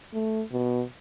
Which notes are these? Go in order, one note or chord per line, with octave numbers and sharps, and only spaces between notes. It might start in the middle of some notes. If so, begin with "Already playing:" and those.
A3
B2